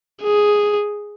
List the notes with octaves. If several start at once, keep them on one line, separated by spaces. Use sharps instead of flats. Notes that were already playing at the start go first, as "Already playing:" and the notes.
G#4